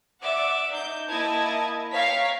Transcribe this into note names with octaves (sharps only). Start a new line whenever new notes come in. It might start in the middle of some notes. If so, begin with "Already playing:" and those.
D5 E5 F#5 D6
D#4 G6
A#3 E4 D#5 A5 G#6
C#5 F5 G5 A#5 C#6 B6